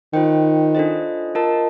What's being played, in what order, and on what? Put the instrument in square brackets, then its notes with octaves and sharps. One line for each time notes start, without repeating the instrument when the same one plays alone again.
[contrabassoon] D#3 [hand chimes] F4 C5 G5
[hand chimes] D4 F4 A4 C5 D#5
F4 A#4 D#5 A5